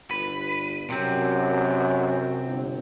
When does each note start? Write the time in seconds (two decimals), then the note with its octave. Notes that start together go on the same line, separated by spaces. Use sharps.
0.11 G1 B4
0.90 F#2 C3 C4
2.45 G1